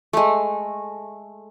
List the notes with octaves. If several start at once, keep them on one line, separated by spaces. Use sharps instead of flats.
G#3 A3